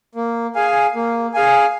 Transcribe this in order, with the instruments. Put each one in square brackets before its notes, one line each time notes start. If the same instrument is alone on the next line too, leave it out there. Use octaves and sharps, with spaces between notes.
[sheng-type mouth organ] A#3
G#4 F5 G#5
A#3
G#4 F5 G#5